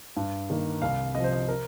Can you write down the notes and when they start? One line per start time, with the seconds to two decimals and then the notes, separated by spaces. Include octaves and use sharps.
0.17 G2
0.50 D#3 A#3
0.82 C2 F5
1.15 C3 F3 D#5
1.24 C5
1.33 D#5
1.48 A#4